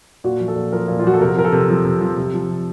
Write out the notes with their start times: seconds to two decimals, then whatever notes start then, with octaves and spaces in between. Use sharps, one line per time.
0.24 A#2 F#4
0.40 F3
0.48 A4
0.56 A#2
0.72 F3 A#4
0.88 A#2
0.99 F4
1.04 F3 F#4
1.14 A4
1.20 C3 A#4
1.37 F3 A#4
1.45 A4
1.52 C3
1.70 F3
1.85 C3
2.01 F3
2.17 C3
2.34 F3
2.50 C3